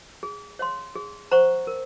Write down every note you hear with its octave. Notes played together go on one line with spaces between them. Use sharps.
G#4
C#5 F5 C6
G#4
C5 F#5 A#5 C#6
A#4